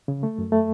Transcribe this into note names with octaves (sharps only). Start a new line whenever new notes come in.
C#3
A3
F#2
A3